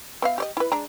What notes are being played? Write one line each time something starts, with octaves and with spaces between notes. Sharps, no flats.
B3 E5 F5
G4 D5 D#5
E4 B4
G#3 D4 A#5